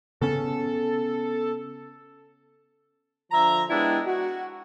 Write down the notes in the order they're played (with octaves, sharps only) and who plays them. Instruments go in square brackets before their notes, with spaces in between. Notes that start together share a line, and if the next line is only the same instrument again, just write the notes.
[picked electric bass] C#3 B3 C#4 [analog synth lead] A4
[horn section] D3 F3 E5 A#5
G#3 B3 D4 E4 G4
F#4